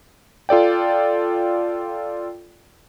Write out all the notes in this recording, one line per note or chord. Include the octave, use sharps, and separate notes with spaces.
F4 A4 D5 G5